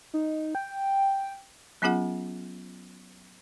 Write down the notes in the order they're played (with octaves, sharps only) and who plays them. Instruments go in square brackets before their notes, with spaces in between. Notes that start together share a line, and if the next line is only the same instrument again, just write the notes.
[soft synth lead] D#4
G5
[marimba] F#3 B3 C#4 F4 G#4 F#5